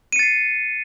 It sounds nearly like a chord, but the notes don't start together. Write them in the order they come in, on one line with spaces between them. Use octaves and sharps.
D#7 C#7 A6 C7